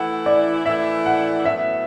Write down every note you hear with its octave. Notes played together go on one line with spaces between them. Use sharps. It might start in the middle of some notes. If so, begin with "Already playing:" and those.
Already playing: E3 A3 E4 F#5
D5
E3 A3 E4 E5
F#5
A2 F#3 B3 E5